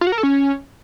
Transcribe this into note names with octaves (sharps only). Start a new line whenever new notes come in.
F4
F#4
A#4
A4
C#4